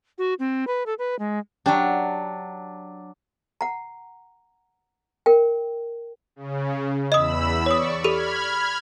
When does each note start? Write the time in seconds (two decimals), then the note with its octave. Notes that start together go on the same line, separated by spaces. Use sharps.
0.18 F#4
0.39 C4
0.67 B4
0.86 A4
0.99 B4
1.19 G#3
1.66 F#3 D4 G4 D5 A5
3.61 F#5 A#5
5.26 A#4 G5
6.36 C#3
7.12 E2 D#5 B5 D#6 E6
7.66 C#5 D5 C#6 D#6
8.04 G4 A4 B5 F6 G#6 D#7